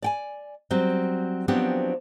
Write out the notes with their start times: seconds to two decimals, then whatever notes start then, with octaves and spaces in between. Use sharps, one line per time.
0.02 D5 G5 G#5
0.70 F#3 G3 C4
1.48 F3 F#3 B3 C4 D4 G4